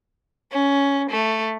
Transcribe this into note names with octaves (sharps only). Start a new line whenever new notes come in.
C#4
A3